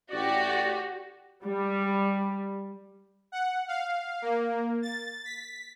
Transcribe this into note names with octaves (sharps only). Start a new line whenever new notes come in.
A1 F#4 G4 D5
G3
F#5
F5
A#3
A6
B6